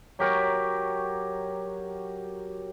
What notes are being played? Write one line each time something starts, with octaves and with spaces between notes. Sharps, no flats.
F#3 G4 A#4 C#5